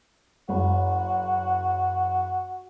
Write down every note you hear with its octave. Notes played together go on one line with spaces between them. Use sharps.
F#1 F#4